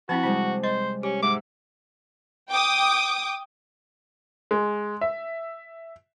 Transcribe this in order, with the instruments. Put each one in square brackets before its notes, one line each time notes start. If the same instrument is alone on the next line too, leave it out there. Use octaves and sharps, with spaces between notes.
[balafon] F3 C4 E4 [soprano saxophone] F#4 [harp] A5
[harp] C3 G3 G#3 [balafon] E4
[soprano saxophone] C5 [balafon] D#5
[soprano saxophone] C#4 [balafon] G4
[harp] G#2 E5 F#5 [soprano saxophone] D6
[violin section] G5 D6 D#6
[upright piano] G#3
E5